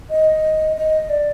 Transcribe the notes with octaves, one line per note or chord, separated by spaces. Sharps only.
D#5
D#5
D5